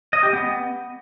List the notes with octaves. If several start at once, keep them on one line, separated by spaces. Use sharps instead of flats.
D#5
G4
B3